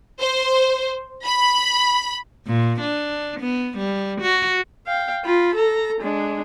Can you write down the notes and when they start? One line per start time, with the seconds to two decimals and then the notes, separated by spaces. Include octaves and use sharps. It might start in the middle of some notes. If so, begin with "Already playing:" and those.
0.20 C5
1.25 B5
2.47 A#2
2.81 D4
3.40 B3
3.78 G3
4.21 F#4
4.87 F5 G5
5.25 F4 B5
5.55 A4 A#5
6.01 G#3 D4